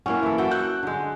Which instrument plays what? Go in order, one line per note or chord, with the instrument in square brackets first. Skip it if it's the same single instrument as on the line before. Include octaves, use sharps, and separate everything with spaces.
[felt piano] A#3 E4 F#5 [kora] C#4
[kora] E3 A4
F#4 A4 G5
[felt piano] F#6 G6
[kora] D3 G#3